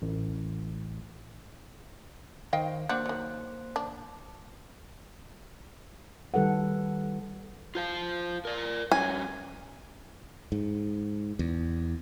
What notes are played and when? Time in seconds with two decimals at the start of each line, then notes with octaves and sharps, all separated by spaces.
0.02 A1
2.53 D#3 C5 D#5 F5 G5
2.89 A#3 D4 F#4 C5 F#6
3.06 D#3 F#3
3.76 D4
6.34 D#3 G3 A4 B4 F#5
7.75 F4 C5 F5
8.45 A#4 D5
8.92 G2 C#4 G#5
10.52 G#2
11.39 E2